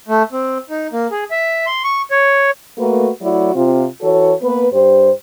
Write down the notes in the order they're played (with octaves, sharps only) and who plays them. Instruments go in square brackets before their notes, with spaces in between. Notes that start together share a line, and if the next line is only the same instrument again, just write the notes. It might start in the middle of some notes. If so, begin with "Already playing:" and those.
[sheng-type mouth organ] A3
C4
D#4
A#3
G#4
E5
C6
C#6
C#5
[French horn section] A3 A#3 F#4 A#4 B4
F#3 A3 E4 F#4 D5
C3 C4 F4
E3 F#4 A4 C#5
A#3 B3 B4
G2 G4 C5